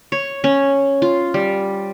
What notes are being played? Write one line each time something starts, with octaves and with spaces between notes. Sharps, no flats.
C#5
C#4
F4
G3